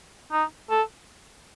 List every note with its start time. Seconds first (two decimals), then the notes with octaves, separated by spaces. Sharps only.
0.32 D#4
0.70 A4